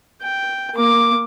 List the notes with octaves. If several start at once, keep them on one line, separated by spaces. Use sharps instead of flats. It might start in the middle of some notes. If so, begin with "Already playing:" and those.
G5
A#3 D6